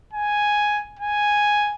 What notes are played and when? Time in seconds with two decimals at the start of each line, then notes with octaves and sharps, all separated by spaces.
0.13 G#5
0.99 G#5